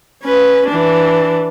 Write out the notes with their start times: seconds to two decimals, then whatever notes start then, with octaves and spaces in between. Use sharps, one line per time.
0.23 C#4 B4
0.68 E3 D4